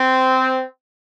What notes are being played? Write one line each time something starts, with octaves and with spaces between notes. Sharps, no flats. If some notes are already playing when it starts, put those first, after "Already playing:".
Already playing: C4